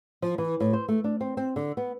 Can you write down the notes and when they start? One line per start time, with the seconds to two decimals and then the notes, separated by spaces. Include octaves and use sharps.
0.22 F3
0.38 E3
0.60 A2
0.73 C5
0.88 A3
1.04 D4
1.21 C4
1.37 C4
1.56 D3
1.77 B3